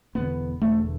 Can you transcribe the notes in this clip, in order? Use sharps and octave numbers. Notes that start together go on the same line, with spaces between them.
E1 E2 D3 B3
E1 E2 D3 A3